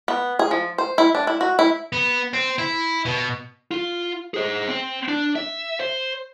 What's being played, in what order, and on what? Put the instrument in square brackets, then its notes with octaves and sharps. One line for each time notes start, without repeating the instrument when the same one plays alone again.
[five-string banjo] B3
G#4
F3
C5
E4
D4
E4
F#4
E4
[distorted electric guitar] B3
C4
E4
B2
[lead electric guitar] F4
G#4 C5
C4
D4
E5
C5